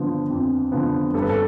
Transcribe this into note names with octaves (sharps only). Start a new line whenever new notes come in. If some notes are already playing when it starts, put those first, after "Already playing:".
Already playing: D3 F3 B3
F2
D3 F3 B3
G2 A4
B4
A4